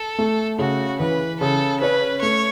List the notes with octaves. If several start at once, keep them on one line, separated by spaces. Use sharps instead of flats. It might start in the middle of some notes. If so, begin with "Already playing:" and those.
Already playing: A4
A3
C#3 F#4
E3 B4
C#3 A4
C#4 B4
A3 C#5